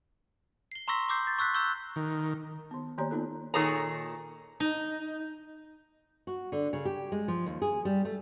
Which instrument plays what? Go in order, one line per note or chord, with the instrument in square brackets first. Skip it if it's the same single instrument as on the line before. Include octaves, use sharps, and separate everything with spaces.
[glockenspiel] C7 G7
A#5 C6 C#6 E6 A#6 B6
C#6 D6 E6 G6 C7
A6
C#6 E6 F#6 B6
A#5 C#6 E6 F#6 G6 G7
[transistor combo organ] D#3
[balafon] D#3 B3
D#3 A#3 G4 C#5 D5 A#5
A#3 B3 D#4 F4 A4
[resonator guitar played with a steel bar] A#2 D#3 G#4 A4 C#5 A#5
[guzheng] D#4
[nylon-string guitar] F#4
D3
C#3
G4
G#3
F3
D#2
G#4
G3
A3